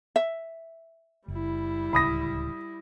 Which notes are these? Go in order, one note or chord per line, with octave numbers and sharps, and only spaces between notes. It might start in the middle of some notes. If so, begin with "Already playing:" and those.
E5
F#1 G3 E4
D1 G#1 C#2 B5 D#6 A#6